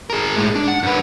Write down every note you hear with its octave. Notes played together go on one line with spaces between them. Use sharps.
G#4 A#4
A2 G#3
D4
F#5
F#2 B4